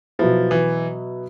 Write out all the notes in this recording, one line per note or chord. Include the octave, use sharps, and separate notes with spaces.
B2 F3 F#3 B3 E4
E3